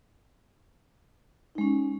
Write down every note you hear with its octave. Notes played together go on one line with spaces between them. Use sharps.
G#3 C#4 D#4